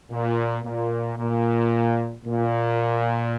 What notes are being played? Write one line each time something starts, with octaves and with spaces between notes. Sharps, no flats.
A#2
A#2
A#2
A#2